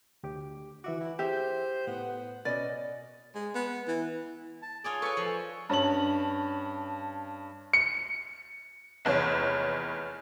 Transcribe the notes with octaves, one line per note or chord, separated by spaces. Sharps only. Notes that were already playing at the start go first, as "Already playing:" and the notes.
D2 G4 D6
E3 F#4 E5 D6
E4
G4 G#4 C5 E5 G5
A2 B3
B2 C#4 B4 D5 D#5
G#3
B3
E3
A5
F4 G#4 C#5 D5
A4 B4 C#5 G#5 C#6
F3
G2 C#4 A5 F#7
C#7
F1 E2 C#5